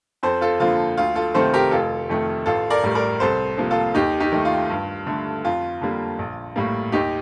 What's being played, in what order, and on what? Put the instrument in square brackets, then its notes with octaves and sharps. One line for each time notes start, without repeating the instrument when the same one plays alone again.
[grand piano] F2 A4 C5
F4 A4
D3 F3 A#3 F4
D2 F4
F4 A4
C3 D#3 A3 A4 C5
G4 A#4
F1 F4 A4
F2 D#3 A3
A1 F4 A4
A#4 D5
A2 G3
A#4 D5
C2 A4 C5
C3 F3 A#3
F4 A4
D#2 D#4 G4
D#4 G4
D#3 A3
F4
G2
D3 A3
F2 F4
D3 G3 A#3
A#1
A2 G3 A#3
D#2 D#4 G4